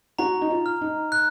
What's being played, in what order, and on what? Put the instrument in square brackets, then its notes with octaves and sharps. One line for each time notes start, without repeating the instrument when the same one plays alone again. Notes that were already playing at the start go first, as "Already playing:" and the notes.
[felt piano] F#4 [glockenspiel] A#5
[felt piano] D#4
F4
[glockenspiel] F6
[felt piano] D#4
[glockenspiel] F#6